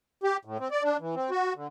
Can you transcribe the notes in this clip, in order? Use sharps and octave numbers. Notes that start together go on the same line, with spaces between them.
G4
A2
C4
D5
D4
E3
C4
F#4
D3